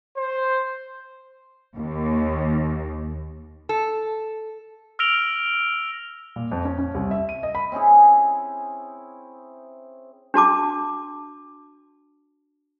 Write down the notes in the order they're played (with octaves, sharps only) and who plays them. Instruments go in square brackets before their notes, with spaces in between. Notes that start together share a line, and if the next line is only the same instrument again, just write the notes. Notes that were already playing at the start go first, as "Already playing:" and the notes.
[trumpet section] C5
[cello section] D#2
[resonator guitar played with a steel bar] A4
[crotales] E6 F6 A#6 D7 F7 G7
[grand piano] A#2
F2
C#4
C#4
C2
E5
D#7
D#5
B5
[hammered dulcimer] C4 C#4 E4 G#4
[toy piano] D4 F#4 A5 D6